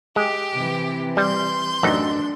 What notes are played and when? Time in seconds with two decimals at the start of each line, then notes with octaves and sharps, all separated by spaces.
0.16 G#3 G4 G5
0.53 C3 E3
1.17 G3 C6 G6
1.83 A1 F#2 D4 D#4